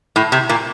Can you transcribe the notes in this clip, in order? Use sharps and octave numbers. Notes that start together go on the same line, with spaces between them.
A2
C3
A#2